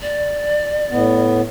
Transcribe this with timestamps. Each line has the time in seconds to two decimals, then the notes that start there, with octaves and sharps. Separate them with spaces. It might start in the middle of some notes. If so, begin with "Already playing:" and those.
0.02 D5
0.91 A2 B3